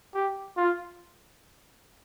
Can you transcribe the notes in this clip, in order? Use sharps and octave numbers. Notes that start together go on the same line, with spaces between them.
G4
F4